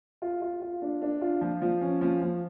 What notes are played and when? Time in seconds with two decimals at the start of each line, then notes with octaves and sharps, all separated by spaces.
0.22 F4
0.42 F4
0.62 F4
0.82 D4
1.02 D4
1.22 F4
1.41 F3
1.62 F3
1.81 C#4
2.01 F3
2.21 F3